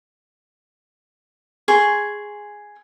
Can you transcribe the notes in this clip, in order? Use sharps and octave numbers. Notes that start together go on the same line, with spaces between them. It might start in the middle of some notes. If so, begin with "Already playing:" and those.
G#4 C6 C#6